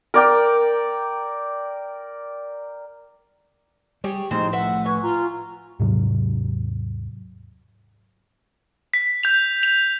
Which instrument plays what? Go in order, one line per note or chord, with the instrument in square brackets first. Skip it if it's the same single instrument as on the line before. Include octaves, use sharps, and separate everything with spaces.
[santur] A#4 D5 G5
[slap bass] G3 [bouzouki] G4 G#4 C#5
[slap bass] A2 F3 A3 [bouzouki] G#3 C4 C5 [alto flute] D#4
[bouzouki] B4 E5 [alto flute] F#5
[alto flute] B4 [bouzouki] G#5 [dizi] C#6
[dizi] F4 [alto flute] A#5
[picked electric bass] D#2 G#2 C3 F#3
[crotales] B6
G6 F7
F7